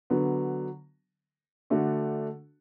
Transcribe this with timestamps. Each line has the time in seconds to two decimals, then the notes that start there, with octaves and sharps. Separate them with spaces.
0.10 D3 F#3 B3
1.70 D3 A3 D4 F#4